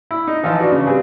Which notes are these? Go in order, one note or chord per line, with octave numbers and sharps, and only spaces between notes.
E4
D#4
E3 F3 D#4 F4 A5
D4 F#4 B4
C#3
G3 C4 G#4 B4